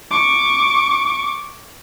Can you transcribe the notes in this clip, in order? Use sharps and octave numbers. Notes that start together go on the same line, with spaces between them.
C#6 D6